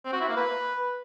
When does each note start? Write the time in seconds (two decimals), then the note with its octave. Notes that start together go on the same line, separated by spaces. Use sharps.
0.05 C4
0.13 F#4
0.21 E4
0.28 A#3
0.36 B4